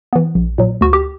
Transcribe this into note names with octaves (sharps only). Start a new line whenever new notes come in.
E3 B3
A#1
A#2 F#3
D2 F#4
G4